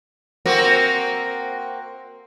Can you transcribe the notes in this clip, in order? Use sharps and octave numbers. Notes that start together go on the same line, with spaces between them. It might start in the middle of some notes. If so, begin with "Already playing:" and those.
A#3 C4 F#4